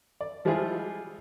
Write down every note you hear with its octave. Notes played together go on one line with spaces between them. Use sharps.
D5
F3 G3 G#3 E4 F4 G#4